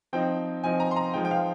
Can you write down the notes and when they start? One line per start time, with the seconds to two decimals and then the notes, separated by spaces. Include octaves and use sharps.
0.13 F3 C4 D#4 G5
0.64 F3 C4 D#4 G#5
0.80 A#5
0.91 C6
0.96 A#5
1.14 F3 G#3 D#4 G5
1.25 G5
1.31 F5